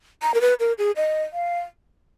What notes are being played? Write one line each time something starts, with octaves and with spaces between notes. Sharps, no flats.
A#5
A#4
B4
A#4
G#4
D#5
F5